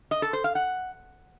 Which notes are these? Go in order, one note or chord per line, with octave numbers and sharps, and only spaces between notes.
D#5
A4
C5
F5
F#5